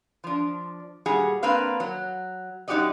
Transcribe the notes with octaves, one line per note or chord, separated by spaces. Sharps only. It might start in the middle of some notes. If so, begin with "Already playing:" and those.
F3 D4
A#2 G3 F#4 G#4
A#3 C4 D4 B4 F5
F#3
F#2 D#4 F#4 G4 D5 D#5